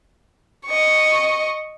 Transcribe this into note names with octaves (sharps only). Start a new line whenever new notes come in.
D#5 C#6